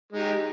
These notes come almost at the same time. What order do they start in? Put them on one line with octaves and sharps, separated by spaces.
G#3 D#4 G4